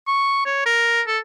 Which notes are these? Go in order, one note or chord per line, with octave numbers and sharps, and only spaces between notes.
C#6
C#5
A#4
A4